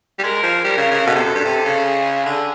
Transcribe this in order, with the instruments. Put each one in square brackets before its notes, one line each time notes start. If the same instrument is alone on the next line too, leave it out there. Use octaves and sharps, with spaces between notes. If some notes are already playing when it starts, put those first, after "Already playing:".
[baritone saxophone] G3
[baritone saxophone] G#3 [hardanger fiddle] A#4
[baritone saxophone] F3
[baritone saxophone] G3 [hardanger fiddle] A#4
[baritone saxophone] C#3
C#3
[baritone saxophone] B2 [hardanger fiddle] A4
[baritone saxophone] C3
F#2
G2
C3
C#3
[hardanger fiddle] G#4
[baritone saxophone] D3